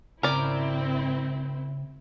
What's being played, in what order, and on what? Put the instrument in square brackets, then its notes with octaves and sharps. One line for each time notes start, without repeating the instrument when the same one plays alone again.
[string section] G#1 C4 E4 [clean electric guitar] C#3 [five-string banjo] A#4 D5